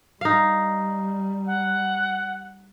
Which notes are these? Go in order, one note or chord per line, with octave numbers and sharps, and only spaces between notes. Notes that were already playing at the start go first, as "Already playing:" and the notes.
G3 D#4 F5
F#5